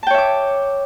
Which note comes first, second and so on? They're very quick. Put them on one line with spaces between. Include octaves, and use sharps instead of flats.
A5 G5 C#5 E5 D6